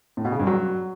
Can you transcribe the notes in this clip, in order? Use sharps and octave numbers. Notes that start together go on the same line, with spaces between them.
A2
B2
C#3
G2
F#3